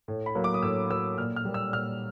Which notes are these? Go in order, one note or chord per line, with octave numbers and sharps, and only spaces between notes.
A2
B5
F#3 A#3
D6
D#6
A2 E6
F#3 A#3 E6
A#2 F6
F6
G3 A#3
E6
A#2 F6